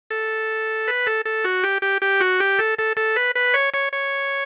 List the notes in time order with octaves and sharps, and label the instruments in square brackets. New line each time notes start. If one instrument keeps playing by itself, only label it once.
[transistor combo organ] A4
B4
A4
A4
F#4
G4
G4
G4
F#4
G4
A4
A4
A4
B4
B4
C#5
C#5
C#5